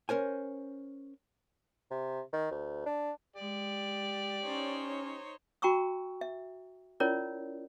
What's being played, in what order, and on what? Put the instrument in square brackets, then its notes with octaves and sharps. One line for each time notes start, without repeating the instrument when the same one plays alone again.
[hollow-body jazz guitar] C#4 A#4 C5 G#5
[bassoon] C3
D#3
D2
D4
[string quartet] G#3 [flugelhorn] G4 [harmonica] D5
[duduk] C#4 [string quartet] D#4 C5 C#5
[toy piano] F#4 G5 A#5 C#6 E6
E5
C#4 E4 F4 A#4 C#5 D5